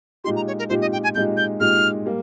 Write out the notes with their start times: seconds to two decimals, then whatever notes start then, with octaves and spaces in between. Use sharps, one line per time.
0.24 A#2 G#3 D#4 G4 C6
0.36 A#5
0.47 C#5
0.59 A#4
0.69 A#2 G#3 D#4 G4 C5
0.81 D#5
0.92 G5
1.04 G#5
1.15 A#2 G#3 D#4 G4 G6
1.37 G6
1.60 A#2 G#3 D#4 G4 F6
2.06 G3 A#3